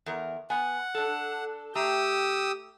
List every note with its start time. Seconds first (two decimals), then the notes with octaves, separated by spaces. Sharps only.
0.06 E2 A#4
0.50 B3 F#5 G#5
0.95 D4 A4
1.75 A3 G4 G5 A#5 D#6 E6